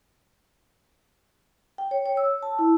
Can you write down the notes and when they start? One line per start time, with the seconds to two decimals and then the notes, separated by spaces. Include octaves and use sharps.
1.78 G5
1.91 C#5
2.06 C#5
2.17 E6
2.43 A5
2.59 E4